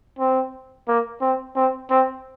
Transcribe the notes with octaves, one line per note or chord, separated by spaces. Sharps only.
C4
A#3
C4
C4
C4